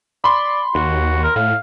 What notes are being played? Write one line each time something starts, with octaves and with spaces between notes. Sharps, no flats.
D5 B5 C6
D#2 F#4
A#4
A2 F5